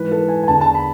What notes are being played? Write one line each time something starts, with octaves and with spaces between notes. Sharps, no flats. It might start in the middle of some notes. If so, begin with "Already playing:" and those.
Already playing: G#2 E3 B4
A4
G#5
G#5
E2 D3 A5
A5
B5